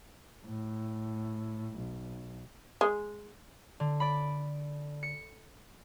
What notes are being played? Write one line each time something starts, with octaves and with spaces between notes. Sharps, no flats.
A2
B1
G#3
D3
D5 B5
C#7